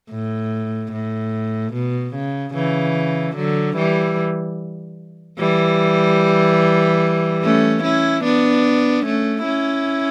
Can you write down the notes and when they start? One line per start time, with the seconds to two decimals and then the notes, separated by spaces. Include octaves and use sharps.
0.11 A2
0.92 A2
1.73 B2
2.15 C#3
2.54 C#3 E3
3.36 D3 F#3
3.76 E3 G3
5.39 E3 G3
7.43 A3 C#4
7.83 C#4 E4
8.23 B3 D4
9.05 A3 C#4
9.45 C#4 E4